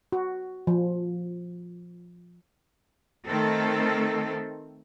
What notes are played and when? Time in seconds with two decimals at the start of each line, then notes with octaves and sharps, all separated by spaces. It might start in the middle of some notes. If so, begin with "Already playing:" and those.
0.12 F#4
0.67 F3
3.26 D#3 A3 C4 A4